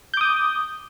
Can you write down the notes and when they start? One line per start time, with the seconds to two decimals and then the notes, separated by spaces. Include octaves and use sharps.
0.14 G6
0.17 D6
0.21 D#6